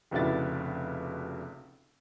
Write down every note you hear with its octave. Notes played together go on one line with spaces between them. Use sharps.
F1 C#2 B2 D4 E4 A6